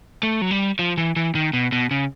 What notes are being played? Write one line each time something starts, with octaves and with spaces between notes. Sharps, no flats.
A3
F#3
G3
F3
E3
E3
D#3
B2
B2
C#3